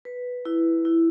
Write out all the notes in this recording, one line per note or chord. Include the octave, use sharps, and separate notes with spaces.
B4
E4
E4